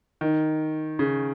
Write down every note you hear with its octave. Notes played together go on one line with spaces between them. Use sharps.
D#3
C#3